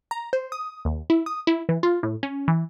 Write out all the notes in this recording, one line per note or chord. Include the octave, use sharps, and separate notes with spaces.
A#5
C5
D#6
D#2
E4
D#6
E4
E3
F4
A2
C#4
E3